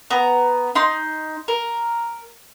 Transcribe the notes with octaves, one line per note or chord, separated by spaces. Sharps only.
B3 A#5
D#4 C6
A#4